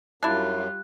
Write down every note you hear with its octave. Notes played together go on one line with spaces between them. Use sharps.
F#2 G3 D4 E4 F4 F#6